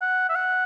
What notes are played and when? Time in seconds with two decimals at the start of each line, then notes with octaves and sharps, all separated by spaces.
0.02 F#5
0.29 E5
0.35 F#5